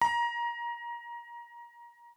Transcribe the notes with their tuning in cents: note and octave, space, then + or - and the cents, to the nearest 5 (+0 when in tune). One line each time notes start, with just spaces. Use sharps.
A#5 +20